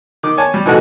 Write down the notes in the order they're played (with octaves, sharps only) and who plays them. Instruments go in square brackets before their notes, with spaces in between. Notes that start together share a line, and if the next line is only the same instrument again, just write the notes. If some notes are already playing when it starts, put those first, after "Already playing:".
[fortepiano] D#3 D6
C#5 G#5 A5
G3
G#2 B2 E3 A3 F#4 F#5